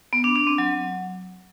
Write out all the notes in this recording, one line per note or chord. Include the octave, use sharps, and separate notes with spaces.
B3
D4
D4
C4
F#3